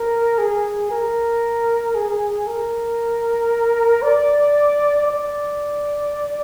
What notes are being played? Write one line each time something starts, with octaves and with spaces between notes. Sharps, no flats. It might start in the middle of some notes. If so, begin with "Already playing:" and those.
Already playing: A#4
G#4
A#4
G#4
A#4
D5
D5